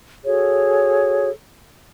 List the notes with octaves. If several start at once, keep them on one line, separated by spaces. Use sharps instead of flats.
F#4 G#4 A4 C#5